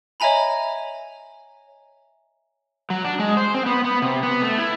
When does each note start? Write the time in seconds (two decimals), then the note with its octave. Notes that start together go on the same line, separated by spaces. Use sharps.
0.20 C#5 D#5 E5 G#5 A#5 B5
2.90 F#3
3.05 D4
3.19 G#3
3.37 C5
3.54 C4
3.66 B3
3.85 B3
4.02 C3
4.23 B3
4.42 A3
4.58 E4